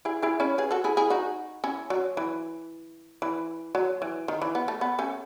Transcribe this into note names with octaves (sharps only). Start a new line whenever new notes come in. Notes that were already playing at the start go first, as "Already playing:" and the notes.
E4 G#4
E4 G#4
C#4 E4
G#4 B4
F#4 A4
E4 G#4
E4 G#4
D#4 F#4
C#4 E4
F#3
E3
E3
F#3
E3
D#3
E3
B3
A3
B3
A3 C#4